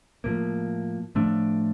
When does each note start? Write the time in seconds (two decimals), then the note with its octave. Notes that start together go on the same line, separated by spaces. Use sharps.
0.24 A2 F3 A#3
1.15 A2 F3 A3 D4